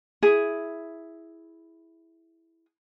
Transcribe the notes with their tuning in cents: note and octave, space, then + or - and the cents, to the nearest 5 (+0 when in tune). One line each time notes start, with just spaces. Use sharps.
E4 +0 G#4 +0